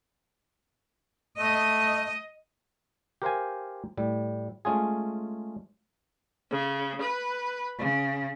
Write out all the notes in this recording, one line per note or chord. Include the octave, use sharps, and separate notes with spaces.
A3 D#5
G4 A#4 C5 F5 G#5
A2 G3
G#3 A3 C#4 F4 G#4
C#3
B4
C#3